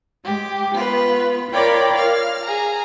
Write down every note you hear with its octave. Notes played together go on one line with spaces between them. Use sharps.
G#3 G4
B3 F4 B4
F4 A#4 C#5 D5 G5 B5
F5 F6
G#4 A#5